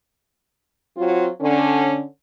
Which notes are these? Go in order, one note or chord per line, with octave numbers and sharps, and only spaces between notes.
F#3 C4 F4
D3 C#4